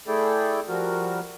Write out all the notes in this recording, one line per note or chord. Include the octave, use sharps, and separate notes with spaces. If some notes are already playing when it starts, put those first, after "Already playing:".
A3 E4 G#4 A4 D5 G5
F3 G3 F#4 A#4